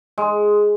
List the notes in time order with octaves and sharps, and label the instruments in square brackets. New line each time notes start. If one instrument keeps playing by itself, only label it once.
[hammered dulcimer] G#3